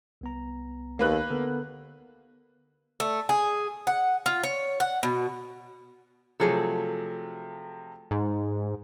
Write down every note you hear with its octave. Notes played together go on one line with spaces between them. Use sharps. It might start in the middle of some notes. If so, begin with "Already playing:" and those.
C2 B3 A#5
D#2 A#3 B4 F#6
D3 B3 A4 A#4
A3
G#4
F#5
F4
C#5
F#5
B2
C3 F3 F#3 A3 G#4 A4
G#2